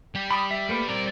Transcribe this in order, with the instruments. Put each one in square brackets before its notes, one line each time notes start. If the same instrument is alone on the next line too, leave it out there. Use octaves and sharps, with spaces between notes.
[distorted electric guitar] G3 G4
[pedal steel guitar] B5 D6 D#6
E5
A3 A#3 B4
[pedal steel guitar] G3 C4 [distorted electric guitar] A#4 D5